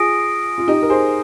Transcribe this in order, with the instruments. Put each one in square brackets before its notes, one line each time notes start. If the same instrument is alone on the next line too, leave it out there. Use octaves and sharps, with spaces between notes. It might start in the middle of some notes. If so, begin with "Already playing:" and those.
Already playing: [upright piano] F4 G#4 [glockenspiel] D#6 A#6 D7
[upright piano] F4
D#4 G4
A#4
G#4 C5